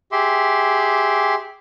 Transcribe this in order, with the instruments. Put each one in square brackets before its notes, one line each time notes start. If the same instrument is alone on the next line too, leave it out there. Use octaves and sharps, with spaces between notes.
[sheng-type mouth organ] G4 G#4 E5 C6 D6